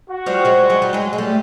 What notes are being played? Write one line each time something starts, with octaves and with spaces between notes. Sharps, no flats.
F#4
F3 G3
F#3 G#3
F#3 G#3
G3
F#3 G#3
G#3
G3 A3